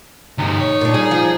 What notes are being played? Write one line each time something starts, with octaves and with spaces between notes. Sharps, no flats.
D2 G2 D#4
C#5
A#2 D4
G3 G#4
F3